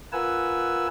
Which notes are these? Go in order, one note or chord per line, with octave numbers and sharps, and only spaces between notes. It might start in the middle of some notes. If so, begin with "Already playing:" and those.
F4 A#4 B4 F#5 G#5 E6